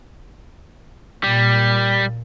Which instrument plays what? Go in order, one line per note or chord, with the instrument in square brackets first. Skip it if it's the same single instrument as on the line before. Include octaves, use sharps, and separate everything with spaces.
[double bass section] A#2 [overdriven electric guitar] G3